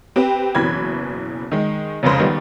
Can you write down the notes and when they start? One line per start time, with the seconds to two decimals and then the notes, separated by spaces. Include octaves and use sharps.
0.16 C4 G4 B4
0.55 F#1 B2 E3 B5 G#6
1.52 D#3 G#3
2.03 F1 C#2 C#3 C5
2.20 D#3 G3 B3